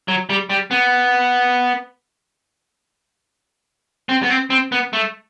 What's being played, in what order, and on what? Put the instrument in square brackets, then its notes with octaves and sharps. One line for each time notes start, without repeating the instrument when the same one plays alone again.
[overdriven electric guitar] F#3
G3
G3
B3
C4
B3
C4
C4
B3
A3